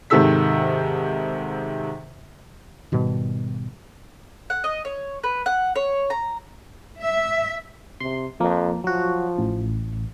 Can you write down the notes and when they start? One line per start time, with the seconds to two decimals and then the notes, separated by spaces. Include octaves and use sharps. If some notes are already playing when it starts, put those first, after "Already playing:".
0.10 G#2 C3 D#3 A4 E6 B6
2.92 G#2 B2 D#3 G3
4.50 F#5
4.64 D#5
4.85 C#5
5.24 B4
5.46 F#5
5.76 C#5
6.10 A#5
7.01 E5
8.00 C3 C6
8.40 F2 F3 A#3
8.84 F3 F#3 F#4
9.38 A1